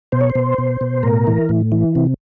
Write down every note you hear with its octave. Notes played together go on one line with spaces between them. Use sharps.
B2 C5
C#5
C5
B2
B2
B2
A2 A#4
E3
A2
E3
C3